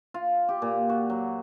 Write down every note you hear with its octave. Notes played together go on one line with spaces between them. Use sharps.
F4
G4
A#2
F#4
F#3